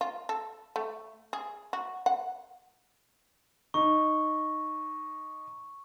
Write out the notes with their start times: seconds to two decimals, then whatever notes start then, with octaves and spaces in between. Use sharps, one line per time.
0.01 F4
0.29 A4
0.76 A3
1.33 G#4
1.73 F#4
2.06 F#5
3.74 D#4 C#6